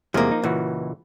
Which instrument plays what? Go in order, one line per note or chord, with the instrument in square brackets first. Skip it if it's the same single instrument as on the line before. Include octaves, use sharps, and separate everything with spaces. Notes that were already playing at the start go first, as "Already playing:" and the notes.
[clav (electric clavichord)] E2 C3 G#3 [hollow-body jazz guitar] F3 A#3
[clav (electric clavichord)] D#4
[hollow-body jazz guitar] C#2 [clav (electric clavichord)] A#2 E3 F#4